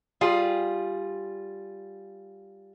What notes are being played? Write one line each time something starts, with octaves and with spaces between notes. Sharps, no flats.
G3 F4 G#4